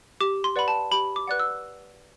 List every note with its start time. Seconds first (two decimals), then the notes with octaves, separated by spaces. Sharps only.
0.21 G4 D6
0.44 C6
0.56 B4 D5 F#5 B5
0.68 A5
0.91 G4 B5
1.16 D6
1.28 B4 D5 F#5 F#6
1.40 E6